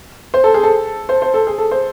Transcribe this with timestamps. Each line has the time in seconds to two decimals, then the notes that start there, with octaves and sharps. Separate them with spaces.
0.34 C5
0.44 A4
0.54 G#4
0.63 A4
1.09 C5
1.22 C5
1.34 A4
1.47 G#4
1.58 A4
1.71 C5